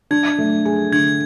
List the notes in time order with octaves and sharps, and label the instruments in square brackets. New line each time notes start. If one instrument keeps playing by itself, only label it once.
[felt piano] D4 [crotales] G#6
[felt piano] A3
G#4
[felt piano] D3 [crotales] G#6